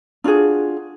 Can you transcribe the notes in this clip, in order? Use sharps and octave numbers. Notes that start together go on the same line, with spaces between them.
D4 F4 F#4 G#4